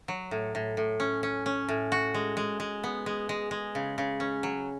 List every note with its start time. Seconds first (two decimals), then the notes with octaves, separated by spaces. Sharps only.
0.08 F#3
0.31 A2
0.55 A2
0.77 A2
1.00 C#4
1.23 C#4
1.46 C#4
1.69 A2
1.92 F#4
2.14 G#3
2.37 G#3
2.60 G#3
2.84 B3
3.06 G#3
3.29 G#3
3.51 G#3
3.75 C#3
3.98 C#3
4.20 C#4
4.43 F#3